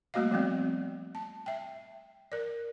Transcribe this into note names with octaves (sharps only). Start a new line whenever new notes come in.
G3 A3 A#3 F#4 D#5 F5
F3 A3 B3 C4
A5
E5 G5
A#4 D5